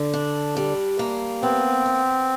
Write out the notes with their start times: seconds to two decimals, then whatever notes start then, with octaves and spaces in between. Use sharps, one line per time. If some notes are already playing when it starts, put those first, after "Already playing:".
Already playing: D3
0.13 D4
0.57 G3
0.99 A#3
1.42 B3 C4
1.86 B3